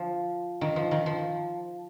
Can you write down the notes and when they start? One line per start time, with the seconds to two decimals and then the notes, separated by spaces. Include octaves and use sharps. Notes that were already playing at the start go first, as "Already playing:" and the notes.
Already playing: F3
0.61 D#3
0.76 F3
0.91 D#3
1.06 F3